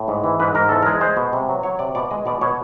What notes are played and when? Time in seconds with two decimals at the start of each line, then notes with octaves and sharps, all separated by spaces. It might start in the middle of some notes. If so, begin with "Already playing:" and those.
Already playing: A2
0.08 G#2
0.24 E3
0.40 G#2 B4
0.55 G#2 A#4
0.69 E2 A4
0.82 A#4
0.86 G#3
1.01 G#3 C5
1.17 B2
1.33 C3
1.49 F#3
1.63 F#3 C#5
1.79 C3 D5
1.95 B2 D5
2.11 G#3 D#5
2.26 B2 D5
2.41 B2 C#5